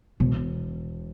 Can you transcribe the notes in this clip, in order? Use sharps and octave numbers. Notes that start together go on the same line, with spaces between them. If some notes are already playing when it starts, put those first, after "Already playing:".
E1 B2